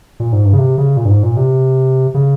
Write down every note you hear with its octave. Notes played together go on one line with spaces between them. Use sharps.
A#2
G#2
G2
C#3
C3
C#3
A#2
G2
G#2
A#2
C3
C#3